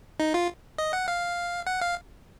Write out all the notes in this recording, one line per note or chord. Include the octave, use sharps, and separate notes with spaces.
D#4
F4
D#5
F#5
F5
F#5
F5